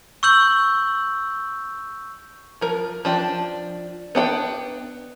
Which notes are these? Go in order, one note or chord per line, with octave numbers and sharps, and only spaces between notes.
C#6 E6 G6 F#7
F3 A#4
F3 D4 G5
B3 D4 F#5 G5